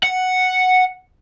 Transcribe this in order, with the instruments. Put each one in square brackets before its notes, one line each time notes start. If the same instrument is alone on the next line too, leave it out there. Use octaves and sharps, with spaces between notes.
[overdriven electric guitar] F#5